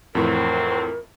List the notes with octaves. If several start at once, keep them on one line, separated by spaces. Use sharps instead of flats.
F2 A2 E3 F#3 C4 A#4